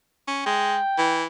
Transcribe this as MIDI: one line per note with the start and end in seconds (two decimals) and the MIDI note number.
0.28 0.43 61
0.46 0.78 56
0.46 1.22 79
0.98 1.24 52